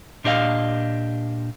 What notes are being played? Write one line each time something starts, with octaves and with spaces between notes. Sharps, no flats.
A#2 D4 G4 D#5 F5